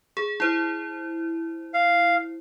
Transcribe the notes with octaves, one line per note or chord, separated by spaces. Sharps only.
G#4
E4 C5
F5